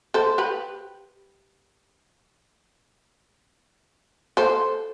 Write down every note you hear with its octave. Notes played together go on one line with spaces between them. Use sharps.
A4 C5
G4 B4
A4 C5